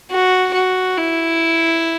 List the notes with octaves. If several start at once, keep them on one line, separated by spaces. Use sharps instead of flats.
F#4
F#4
E4